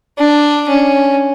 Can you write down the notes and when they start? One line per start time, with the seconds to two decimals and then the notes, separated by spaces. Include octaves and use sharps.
0.18 D4
0.69 C#4